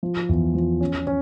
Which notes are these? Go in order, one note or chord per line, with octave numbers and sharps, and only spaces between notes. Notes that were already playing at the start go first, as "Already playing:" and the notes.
F3
E2
F3
C#4
C#4